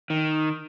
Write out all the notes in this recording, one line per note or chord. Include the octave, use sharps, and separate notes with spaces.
D#3